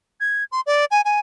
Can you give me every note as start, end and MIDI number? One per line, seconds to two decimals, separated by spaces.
0.20 0.44 92
0.52 0.61 84
0.66 0.85 74
0.91 1.01 80
1.05 1.20 80